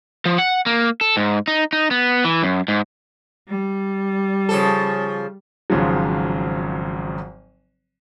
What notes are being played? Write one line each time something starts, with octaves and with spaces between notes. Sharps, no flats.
F3
F#5
A#3
A4
G#2
D#4
D#4
B3
E3
F#2
G#2
G3
C#3 F3 A4
G#1 G#2 C#3 F3 F#3